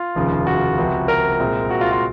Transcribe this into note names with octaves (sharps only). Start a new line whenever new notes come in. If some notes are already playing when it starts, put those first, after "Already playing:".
Already playing: F4
F1 D#2 C#3 F3 G#3
F#4
C#2 C3 F3
A#4
C2 A#2 G#3 C4
F#4
F4
F4